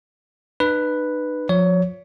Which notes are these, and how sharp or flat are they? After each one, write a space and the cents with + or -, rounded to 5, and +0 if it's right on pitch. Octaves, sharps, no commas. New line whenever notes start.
D#4 -45 B4 +0
F3 +30 C#5 +25